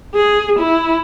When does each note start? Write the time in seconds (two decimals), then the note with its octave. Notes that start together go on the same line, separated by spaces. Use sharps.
0.15 G#4
0.59 E4